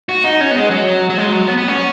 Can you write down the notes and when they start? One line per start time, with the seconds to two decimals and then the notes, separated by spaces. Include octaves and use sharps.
0.09 F#4
0.24 D#4
0.41 C#4
0.51 B3
0.56 G#3
0.70 F#3
1.09 F#3
1.18 G#3
1.32 F#3
1.47 B3
1.58 B3
1.68 C#4